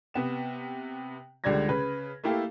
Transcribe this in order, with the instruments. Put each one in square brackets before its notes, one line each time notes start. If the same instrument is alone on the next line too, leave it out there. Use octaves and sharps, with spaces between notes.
[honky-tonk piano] C3 B3 E7
C#2 D3 G3 D5 G#6 A#6
C#3 B4
A3 A#3 E4 G4 A4 F5